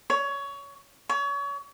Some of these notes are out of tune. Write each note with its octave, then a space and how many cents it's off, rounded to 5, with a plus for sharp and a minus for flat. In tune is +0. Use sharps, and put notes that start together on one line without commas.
C#5 +20
C#5 +30